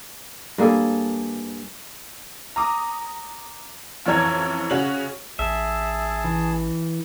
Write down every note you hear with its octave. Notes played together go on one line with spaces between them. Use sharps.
G2 A#3 G#4 A4
A#5 D6 D#6
A1 F2 E3 C#5 A#5 G#6
C#3 C#4 F#4 F#7
A1 G#4 E5 A5
E3